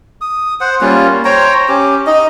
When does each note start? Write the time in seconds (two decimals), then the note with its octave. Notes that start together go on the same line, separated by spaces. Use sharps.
0.21 D#6
0.61 C5 F#5
0.81 G3 A#3 C#4 F4
1.25 C5 C#5 G5 A#5
1.68 C#4 G4
2.07 D#4 D#5